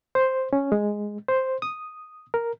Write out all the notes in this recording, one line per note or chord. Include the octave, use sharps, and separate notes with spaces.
C5
C#4
G#3
C5
D#6
A#4